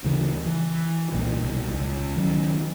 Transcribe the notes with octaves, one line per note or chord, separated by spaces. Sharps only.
D2 C#3 E3
E3
C2 A#2 E3
C2 B2
C#2
D#3 F#3 C#4